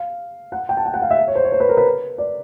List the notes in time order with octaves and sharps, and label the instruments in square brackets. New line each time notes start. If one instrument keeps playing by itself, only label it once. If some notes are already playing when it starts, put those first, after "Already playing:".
Already playing: [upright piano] F5
F#5
G5
A5
G5
F#5
F5
E5
C#5
C5
C#5
C5
B4
A#4
B4
D5